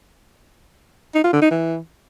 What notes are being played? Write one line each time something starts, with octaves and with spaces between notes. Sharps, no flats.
D#4
F4
D3
D#4
E3